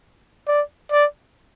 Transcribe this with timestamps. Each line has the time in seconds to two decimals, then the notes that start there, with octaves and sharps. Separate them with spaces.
0.48 D5
0.92 D5